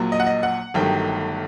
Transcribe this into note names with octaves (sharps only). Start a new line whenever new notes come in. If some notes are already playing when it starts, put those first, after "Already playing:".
Already playing: A#1 A#2 F#3
D#5
F#5
D#5
F#5
G1 G2 D#3 F#3 A3 G5